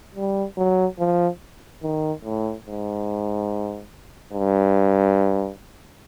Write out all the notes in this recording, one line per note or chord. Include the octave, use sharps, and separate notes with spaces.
G3
F#3
F3
D#3
A2
G#2
G2